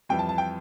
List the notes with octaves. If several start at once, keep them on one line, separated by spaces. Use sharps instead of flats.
F2 E3 G3 G5
A5
A5
G5